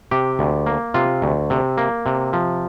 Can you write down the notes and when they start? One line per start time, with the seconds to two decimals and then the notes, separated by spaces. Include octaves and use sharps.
0.11 C3 G4
0.39 D2
0.66 A#3
0.94 C3 F4
1.22 D2
1.50 C3
1.78 A#3
2.06 C3
2.33 F3